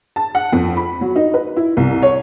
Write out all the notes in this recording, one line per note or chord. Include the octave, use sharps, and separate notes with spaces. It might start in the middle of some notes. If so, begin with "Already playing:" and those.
A5
F#5
F2
B5
F#3
D#4
B4
E4
C2
C#5